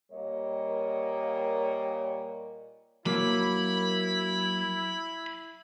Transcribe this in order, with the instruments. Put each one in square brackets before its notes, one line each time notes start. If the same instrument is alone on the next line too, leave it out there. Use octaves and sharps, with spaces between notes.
[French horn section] A#2 G3 A#3 A#4 C#5 D#5
[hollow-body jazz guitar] F#3 A#3 [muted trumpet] E4 [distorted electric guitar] B5